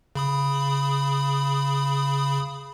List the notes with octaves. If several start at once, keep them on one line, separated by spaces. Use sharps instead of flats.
C#3 B5 D#6